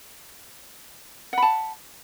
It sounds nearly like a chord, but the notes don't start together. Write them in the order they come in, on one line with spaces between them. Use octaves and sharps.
F#5 B5 A5